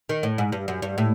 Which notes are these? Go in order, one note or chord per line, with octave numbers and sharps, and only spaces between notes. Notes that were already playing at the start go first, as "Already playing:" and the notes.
D#3
A2
G#2
G2
F#2
G2
A2